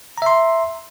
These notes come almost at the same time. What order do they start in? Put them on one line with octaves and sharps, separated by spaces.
A#5 E5 C6